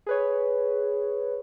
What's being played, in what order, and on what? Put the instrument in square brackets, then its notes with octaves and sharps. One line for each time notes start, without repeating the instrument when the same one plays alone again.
[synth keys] G#4 B4 C#5